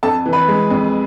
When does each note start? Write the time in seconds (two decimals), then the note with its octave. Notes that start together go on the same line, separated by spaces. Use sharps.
0.03 F2 A4 A5
0.25 E3
0.33 B4 B5
0.48 G#3
0.71 F2